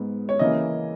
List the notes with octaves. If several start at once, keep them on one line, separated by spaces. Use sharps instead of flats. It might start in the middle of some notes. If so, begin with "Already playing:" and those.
Already playing: G#2 B3
C#5
C#3 E3 A#3 D#5